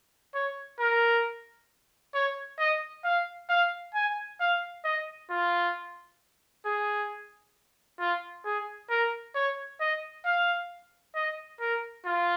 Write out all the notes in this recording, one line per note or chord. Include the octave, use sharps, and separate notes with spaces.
C#5
A#4
C#5
D#5
F5
F5
G#5
F5
D#5
F4
G#4
F4
G#4
A#4
C#5
D#5
F5
D#5
A#4
F4